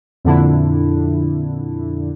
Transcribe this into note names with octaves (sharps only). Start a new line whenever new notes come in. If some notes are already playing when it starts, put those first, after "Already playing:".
F2 A#2 D3 D4 E4